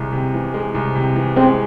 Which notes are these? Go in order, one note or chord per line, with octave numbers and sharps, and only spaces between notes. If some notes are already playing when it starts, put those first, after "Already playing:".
Already playing: C2 G#3
C3
E3
G#3
C2
C3
E3
G#3 C4